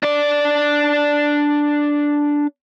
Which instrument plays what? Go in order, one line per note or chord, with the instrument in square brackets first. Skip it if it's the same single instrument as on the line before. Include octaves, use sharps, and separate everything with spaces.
[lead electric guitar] D4 D5